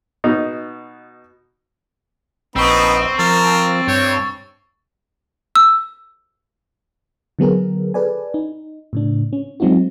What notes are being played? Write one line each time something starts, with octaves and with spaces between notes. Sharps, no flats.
B2 D#4
A#1 B3 C4 D#4 B5 C#6 E6
F3 A#4 A6
G2 C#5 G5
E6
D3 F#3 B3 G#4 A#4
G#4 A4 B4 D5 G#5
D#4
A2 C#3 D4
C#4
F#3 G#3 C4 D#4 F4 F#4